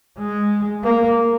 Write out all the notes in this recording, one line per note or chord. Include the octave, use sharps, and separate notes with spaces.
G#3
A#3